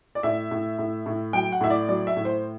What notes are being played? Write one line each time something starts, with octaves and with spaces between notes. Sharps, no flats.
D5
A2 E5
A2
A2
A2
F#3 G5
F#5
A2 E5
D5
F#3 D5
E5
A2
C5